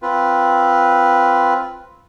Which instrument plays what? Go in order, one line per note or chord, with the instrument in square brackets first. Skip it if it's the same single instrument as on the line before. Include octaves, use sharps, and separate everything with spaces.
[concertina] C4 F4 B4